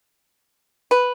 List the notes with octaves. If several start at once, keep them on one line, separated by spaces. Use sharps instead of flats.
B4